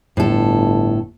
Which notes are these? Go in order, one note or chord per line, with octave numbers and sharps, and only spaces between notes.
G1 A2 A4